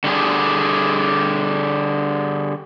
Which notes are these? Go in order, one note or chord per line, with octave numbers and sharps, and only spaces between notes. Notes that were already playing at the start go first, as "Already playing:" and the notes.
D3 G3 D4 G#4